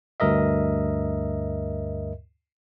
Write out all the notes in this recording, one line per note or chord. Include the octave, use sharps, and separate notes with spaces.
D2 G2 A#4 D#5 E5